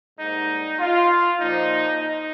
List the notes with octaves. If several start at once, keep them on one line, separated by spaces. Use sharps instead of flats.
G#2 G3 A#3 D#4
F4
A#2 F3 A#3 D#4
D#4